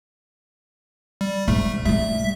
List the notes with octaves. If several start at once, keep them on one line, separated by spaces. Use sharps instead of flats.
G3
G#2 A3
G3 A3 E5